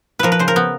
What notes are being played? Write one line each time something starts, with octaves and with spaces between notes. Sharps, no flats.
F3 A#4 B4
B4
C#3 C5
A#4
B3